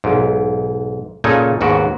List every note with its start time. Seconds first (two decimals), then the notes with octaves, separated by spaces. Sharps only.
0.04 B1 G#2
1.24 A#2 C#3 D#4 A4 G#5
1.61 D#2 G#2 B3 F#4